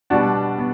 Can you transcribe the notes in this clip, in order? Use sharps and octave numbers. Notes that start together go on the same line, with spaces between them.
B2 G3 B3 D4 F#4
B3